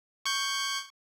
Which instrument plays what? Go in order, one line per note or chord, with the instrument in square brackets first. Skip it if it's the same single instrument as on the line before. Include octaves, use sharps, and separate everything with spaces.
[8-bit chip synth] C#6 G6